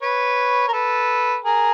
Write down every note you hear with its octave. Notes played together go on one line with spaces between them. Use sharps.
B4 C#5
A#4
A4 B4
G#4 A#4